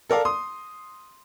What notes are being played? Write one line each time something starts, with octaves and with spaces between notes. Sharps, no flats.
A4 A#4 D5 F5
C6 D#6